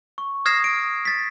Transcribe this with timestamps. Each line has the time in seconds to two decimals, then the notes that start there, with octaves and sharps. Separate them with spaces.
0.18 C#6
0.45 D#6 F6 G#6 A#6 C7 E7
0.64 D7
1.05 A6 B6